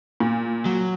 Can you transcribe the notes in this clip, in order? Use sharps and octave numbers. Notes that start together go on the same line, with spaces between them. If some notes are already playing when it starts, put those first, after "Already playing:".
A#2
F#3